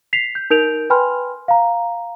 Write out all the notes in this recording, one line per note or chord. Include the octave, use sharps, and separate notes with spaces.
B6 C7 F7
G6
D#4 A#4 G6 D7 F7
B4 G5 G#5 B5 C6 F6
F5 A#5